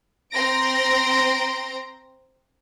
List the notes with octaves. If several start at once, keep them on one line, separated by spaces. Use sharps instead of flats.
C4 A#5 C6 A#6 D7